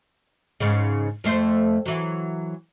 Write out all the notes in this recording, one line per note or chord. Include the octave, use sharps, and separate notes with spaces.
G#2 C#3
F2 A3 C5
E3 F#3